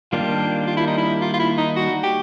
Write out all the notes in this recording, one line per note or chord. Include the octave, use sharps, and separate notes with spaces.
D#3 G3 A#3 D4 F4 G4
F4
E4
D#4
E4
F4
F4
E4
D#4
F#4
G4